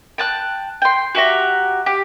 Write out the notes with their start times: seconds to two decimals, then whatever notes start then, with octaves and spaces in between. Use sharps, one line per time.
0.18 G5 A5 F#6
0.82 G5 C6
1.15 F#4 G4 E5 A#5
1.86 G4